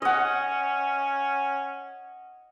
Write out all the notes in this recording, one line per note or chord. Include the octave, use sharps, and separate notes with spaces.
C#4 D#5 F#5